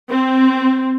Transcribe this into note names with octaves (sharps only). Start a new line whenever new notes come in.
C4